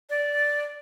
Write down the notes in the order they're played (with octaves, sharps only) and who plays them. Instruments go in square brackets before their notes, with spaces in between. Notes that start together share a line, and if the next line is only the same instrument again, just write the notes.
[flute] D5